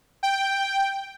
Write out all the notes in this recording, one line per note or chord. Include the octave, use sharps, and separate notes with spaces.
G5